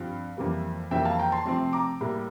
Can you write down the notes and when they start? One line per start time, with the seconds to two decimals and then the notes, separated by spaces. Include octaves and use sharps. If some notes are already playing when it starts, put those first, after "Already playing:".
Already playing: G2 F3 C4 F5
0.37 F2 E3 G3 A#3
0.91 F2 E3 G3 A#3 E5 G5
1.05 F5 A5
1.18 G5 A#5
1.32 A5 C6
1.46 C3 F3 A3 C4 A5 C6
1.73 A#5 D6
2.01 A2 G3 A#3